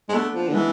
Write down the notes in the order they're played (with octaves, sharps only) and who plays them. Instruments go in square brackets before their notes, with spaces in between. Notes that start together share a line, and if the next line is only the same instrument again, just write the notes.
[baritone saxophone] G#3
[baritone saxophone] A3 [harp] B3 D4
[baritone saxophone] F3
D3
[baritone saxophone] E3 [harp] G#3 B3